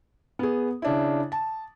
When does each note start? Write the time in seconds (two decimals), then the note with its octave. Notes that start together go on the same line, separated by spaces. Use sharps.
0.39 B3 G#4
0.82 C#3 D4 E4
1.32 A5